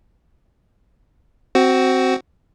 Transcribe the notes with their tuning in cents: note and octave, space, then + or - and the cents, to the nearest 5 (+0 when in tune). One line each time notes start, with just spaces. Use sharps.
C4 +0 F#4 +15